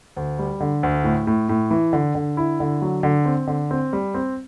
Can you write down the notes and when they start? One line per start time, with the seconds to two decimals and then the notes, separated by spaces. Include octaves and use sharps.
0.16 D2
0.39 G3
0.60 D3
0.83 D2
1.04 A2
1.27 A2
1.49 A2
1.71 E3
1.93 D3
2.15 D3
2.37 E4
2.60 D3
2.82 F#3
3.03 D3
3.25 C4
3.47 D3
3.71 C4
3.93 G3
4.14 C4